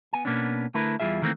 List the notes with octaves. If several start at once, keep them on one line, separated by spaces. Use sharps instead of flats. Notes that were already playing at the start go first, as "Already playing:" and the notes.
B3 G#5
B2 A#3 B3 C#4 D4
D3 A3 E4 A#4 B4
E2 E3 G3 F4 G#4 E5
D#3 E3 A3 A#3 C4